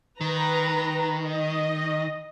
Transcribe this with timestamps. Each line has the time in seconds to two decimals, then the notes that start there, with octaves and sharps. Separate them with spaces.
0.21 D#3 B4 A#5
1.26 D#5